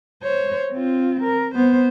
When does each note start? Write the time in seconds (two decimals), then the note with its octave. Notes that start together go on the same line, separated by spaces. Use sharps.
0.23 C5 C#5
0.73 C4 F4
1.23 A#4
1.55 B3 C5